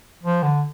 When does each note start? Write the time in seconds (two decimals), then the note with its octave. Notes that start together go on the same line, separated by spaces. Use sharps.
0.23 F3
0.43 D3